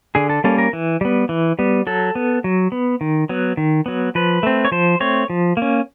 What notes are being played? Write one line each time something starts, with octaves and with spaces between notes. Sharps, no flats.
D3 G#4
A4
G3 A#3 C#4 A4
A#4
E3
G3 B3
E3
G3 B3
F#3 A4
B3
F#3
B3
D#3
F#3 B3
D#3
F#3 B3
F3 B4
A3 C4
C#5
F3 C5
A3 C4 C#5
F3
A#3 C#4